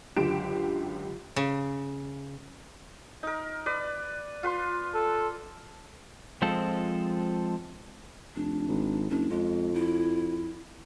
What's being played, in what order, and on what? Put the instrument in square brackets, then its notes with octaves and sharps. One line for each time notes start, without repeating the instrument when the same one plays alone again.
[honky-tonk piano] C#2 F#2 D3 G4 D7 E7
[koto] C#3
[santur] D#4 A#4
B4 D5
F4 B4 C6
[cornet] A4
[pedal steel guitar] F3 G#3 C4 F4 A4
[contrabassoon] F1 [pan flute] D4
[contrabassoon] G#1
[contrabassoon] F#1 [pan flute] D4
[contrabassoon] F2 [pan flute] G#3
[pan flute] E4